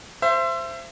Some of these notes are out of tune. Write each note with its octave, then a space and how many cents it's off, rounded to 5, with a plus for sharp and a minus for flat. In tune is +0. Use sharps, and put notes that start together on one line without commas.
C5 +0 E5 +30